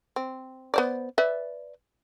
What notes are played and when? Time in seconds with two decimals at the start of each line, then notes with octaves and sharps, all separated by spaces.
0.16 C4
0.74 B3 C5 D5
1.18 B4 D5 E5